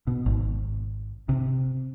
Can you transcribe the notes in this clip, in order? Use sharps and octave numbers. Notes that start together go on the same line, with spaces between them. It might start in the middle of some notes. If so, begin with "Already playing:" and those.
B2
G#1
C3